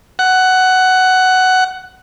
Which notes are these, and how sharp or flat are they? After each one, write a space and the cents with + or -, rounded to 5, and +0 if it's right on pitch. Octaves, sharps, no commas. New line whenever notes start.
F#5 +10